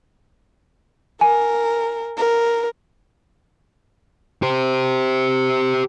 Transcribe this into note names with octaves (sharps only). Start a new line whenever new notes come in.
A#4 G#5
A#4
G4 C5